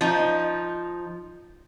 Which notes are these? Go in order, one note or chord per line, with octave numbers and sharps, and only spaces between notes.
F3 D#4